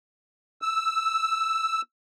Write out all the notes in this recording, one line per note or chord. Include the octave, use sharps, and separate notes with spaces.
E6